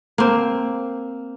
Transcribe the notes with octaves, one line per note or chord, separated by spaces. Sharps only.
A#3 C4